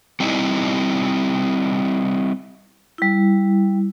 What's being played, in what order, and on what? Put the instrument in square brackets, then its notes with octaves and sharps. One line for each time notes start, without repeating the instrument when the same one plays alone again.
[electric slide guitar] G3 C4 D#4 E4
[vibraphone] G3 E4